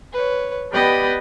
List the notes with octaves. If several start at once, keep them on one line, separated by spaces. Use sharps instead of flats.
B4 C#5
B3 G4 B4 D5 D#5 G5